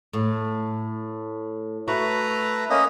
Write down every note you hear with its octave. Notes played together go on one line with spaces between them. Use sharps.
A2
A3 F#4 B4 A#5
A#3 C#4 D#5